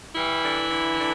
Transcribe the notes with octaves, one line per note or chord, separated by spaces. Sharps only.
E3 G3 E4
D3
D3
D3